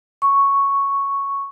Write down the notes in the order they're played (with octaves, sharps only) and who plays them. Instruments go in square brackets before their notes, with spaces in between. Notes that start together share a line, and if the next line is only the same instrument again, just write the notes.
[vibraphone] C#6